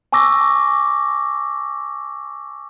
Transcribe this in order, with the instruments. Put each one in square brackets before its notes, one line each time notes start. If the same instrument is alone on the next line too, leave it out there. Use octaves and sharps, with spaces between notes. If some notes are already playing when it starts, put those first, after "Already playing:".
[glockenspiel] G#5 A5 C#6 D6 E6 A#6